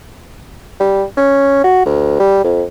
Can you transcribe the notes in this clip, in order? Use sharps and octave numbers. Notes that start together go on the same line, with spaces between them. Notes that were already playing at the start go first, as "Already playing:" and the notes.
G3
C#4
F#4
D2
G3
F2